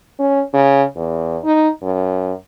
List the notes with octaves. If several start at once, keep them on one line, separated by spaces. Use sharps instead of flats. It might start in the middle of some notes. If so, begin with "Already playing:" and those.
C#4
C#3
E2
D#4
F#2